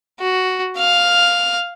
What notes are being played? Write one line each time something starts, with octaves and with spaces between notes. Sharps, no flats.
F#4
F5 F6